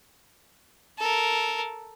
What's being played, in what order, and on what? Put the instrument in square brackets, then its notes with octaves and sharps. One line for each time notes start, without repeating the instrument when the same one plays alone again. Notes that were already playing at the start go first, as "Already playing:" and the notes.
[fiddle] A4 A#4